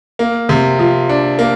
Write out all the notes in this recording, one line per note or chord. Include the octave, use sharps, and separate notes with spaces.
A#3
C3
F3
D4
A#3